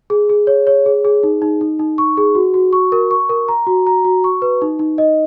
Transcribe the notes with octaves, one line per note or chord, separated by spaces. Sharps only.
G#4
G#4
C#5
C#5
G#4
G#4
D#4
D#4
D#4
D#4
C#6
G#4
F#4
F#4
C#6
A#4
C#6
A#4
A#5
F#4
A#5
F#4
C#6
B4
D#4
D#4
D#5